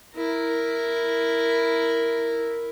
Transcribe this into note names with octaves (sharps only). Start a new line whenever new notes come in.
E4 A#4